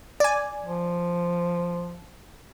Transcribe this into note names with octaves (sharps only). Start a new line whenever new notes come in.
D5 G#5
F3